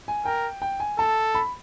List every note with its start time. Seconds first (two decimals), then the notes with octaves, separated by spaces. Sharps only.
0.08 G#5
0.25 A#4 G5
0.62 G5
0.80 G#5
0.98 A4 A5
1.35 B5